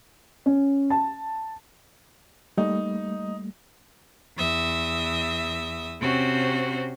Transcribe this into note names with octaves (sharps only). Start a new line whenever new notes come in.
C#4
A5
G3 A3 A#3 D#4
E2 E5 D#6
C3 C4 C#4 F#4 C5